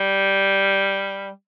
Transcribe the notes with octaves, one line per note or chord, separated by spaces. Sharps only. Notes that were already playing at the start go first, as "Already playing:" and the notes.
Already playing: G3